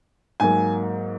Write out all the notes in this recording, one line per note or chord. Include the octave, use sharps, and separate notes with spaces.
G#2 F#3 A#3 G#5